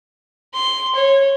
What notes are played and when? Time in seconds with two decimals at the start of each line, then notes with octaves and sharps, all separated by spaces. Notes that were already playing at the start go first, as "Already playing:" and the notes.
0.54 C6
0.95 C#5